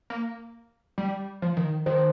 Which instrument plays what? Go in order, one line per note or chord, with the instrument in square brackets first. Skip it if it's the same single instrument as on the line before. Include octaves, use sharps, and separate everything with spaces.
[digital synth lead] A#3
G3
F3
D#3
[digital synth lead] D#3 [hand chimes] C5